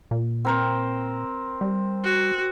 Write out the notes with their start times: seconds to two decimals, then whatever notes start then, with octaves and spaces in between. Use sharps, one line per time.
0.11 A#2
0.45 C4 A#4 C5
1.61 G3
2.04 F#4